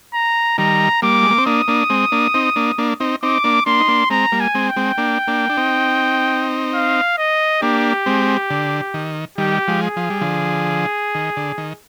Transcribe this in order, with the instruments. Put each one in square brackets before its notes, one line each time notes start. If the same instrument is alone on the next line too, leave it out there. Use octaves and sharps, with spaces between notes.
[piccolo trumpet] A#5
[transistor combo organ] D#3 G3 [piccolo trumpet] A#5
[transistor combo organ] G3 A#3 [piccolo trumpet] D6
[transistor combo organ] G#3
A#3
C4
[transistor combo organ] A#3 D4 [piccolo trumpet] D#6
[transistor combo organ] A#3 D4
G#3 C4
A#3 D4
C4 D#4
A#3 D4
A#3 D4
C4 D#4
[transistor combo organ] C4 D#4 [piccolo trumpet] D6
[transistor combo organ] A#3 D4
[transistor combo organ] A#3 D4 [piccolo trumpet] C6
[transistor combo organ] D#4
A#3 D4
[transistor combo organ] G#3 C4 [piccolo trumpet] A#5
[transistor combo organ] G3 A#3
[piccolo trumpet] G#5
[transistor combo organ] G#3 C4
[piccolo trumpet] G5
[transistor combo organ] G#3 C4
A#3 D4
A#3 D4
D4
C4 D#4
[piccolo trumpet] F5
D#5
[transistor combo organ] A#3 D4 [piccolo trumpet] G4
[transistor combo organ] G#3 C4
D3
D#3
[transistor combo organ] D#3 G3 [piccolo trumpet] G4
[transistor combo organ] F3 G#3
[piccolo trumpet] G#4
[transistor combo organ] F3
G3
D3 F3
D#3
D3
D#3